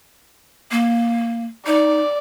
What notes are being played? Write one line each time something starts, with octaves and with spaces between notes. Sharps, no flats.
A#3
D#4 D5